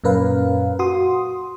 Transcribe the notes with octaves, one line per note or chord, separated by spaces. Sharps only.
F#2 A#2 C#4 A#4 B4 F5
F#4 C6 D#6